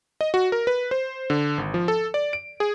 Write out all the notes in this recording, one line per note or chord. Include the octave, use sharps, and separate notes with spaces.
D#5
F#4
A#4
B4
C5
D3
G#1
F3
A4
D5
D7
G#4